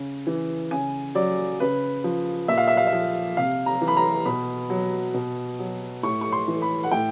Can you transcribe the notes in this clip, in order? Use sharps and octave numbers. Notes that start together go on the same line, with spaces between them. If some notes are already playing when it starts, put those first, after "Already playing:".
Already playing: C#3
E3
C#3 G#5
F#3 D5
C#3 B4
F3
A#2 E5
F5
E5
F5
E5
F3
C3 F5
A#5
E3
B5
A#5
B2 B5
F#3
B2
F#3
A2 C#6
C#6
C6
E3
B5
F#5
A2 G5